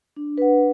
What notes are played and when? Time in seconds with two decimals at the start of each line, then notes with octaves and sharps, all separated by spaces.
0.16 D4
0.38 B4 F#5